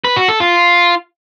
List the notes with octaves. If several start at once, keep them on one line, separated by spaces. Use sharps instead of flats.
B4
F#4
A4
F4